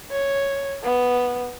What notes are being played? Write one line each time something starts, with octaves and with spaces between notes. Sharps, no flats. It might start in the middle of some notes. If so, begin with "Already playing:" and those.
C#5
B3